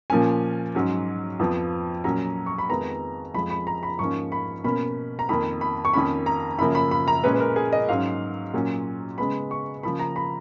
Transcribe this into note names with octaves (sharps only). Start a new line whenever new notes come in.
A#2 F3 A#3 C#4 G#5
G#2 F#3 C#4
F2 F3 B3
A#2 F#3 C#4 A#5
C#6
B5
F2 D#3 G#3 B3 A#5
F2 F3 G#3 B5
B5
A#5
B5
G#2 F3 A#3 C#4 C#6
B5
B2 A#3 C#4 B5
A#5
F2 D#3 A#3 B5
B5
C#6
F2 D#3 A#3 C#4 B5
A#5
F#2 C#3 F3 A#3 C#4 B5
B5
B5
A#5
A#2 G#3 C#4 B4
B4
A#4
G#4
D#5
G#2 F#3 C#4 F5
A#2 F#3 C#4
C#3 G#3 B3 B5
C#6
C#3 F3 A#3 B5
A#5
B5